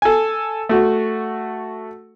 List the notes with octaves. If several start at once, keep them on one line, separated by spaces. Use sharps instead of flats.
A4 G#5
A3 F#4